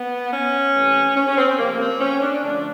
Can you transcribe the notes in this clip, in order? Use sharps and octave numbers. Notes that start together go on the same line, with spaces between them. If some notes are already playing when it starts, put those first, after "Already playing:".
Already playing: B3
C#4
C3 E3 A3
C#4
C#4
C4
C4
C3 F3 A3 A#3
C4
C#4
D4
D3 F3 A3 D4